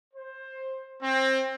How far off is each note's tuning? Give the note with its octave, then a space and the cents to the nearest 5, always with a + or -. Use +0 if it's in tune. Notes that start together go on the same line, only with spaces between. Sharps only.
C5 +15
C4 +20